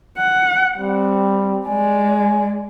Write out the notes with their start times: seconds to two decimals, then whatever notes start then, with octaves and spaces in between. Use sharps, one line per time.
0.17 F#5
0.78 G3 C4
1.67 G#3 D5 G#5